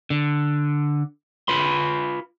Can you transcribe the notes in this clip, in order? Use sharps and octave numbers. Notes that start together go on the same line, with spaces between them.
D3
F4 B4 B5 C6